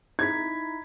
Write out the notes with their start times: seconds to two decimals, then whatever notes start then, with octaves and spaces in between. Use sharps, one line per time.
0.19 D#4 E4 G#6 B6